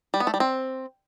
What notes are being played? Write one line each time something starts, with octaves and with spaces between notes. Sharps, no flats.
G3
B3
A3
G3
C4